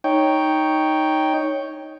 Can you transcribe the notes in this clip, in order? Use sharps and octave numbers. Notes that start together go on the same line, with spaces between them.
D#4 C#5 G5